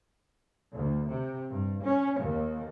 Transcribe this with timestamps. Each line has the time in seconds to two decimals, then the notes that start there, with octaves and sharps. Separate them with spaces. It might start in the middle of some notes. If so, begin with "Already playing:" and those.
0.73 D2
1.09 C3
1.49 G2
1.83 C#4
2.20 D#2